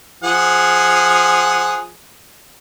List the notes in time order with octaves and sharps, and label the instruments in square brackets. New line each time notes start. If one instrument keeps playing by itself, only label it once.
[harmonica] F3 G#4 F#5